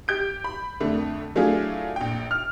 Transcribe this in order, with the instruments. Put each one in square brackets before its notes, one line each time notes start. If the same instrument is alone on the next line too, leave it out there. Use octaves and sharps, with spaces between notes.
[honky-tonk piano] G4 G6 D7
B5
F2 D3 A3
F#3 A3 D4 E4 F4 G#4
A#1 G5
F6